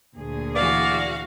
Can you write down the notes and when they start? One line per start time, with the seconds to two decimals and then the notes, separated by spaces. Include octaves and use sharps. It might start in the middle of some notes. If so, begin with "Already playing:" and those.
0.15 D2 A#2 G#4
0.55 E3 F#4 D5 F5